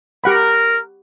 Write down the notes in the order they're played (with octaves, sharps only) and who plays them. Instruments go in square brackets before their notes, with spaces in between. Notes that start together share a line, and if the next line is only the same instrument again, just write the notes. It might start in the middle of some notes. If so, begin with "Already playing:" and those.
[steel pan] G4 F#5 B5 [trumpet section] A#4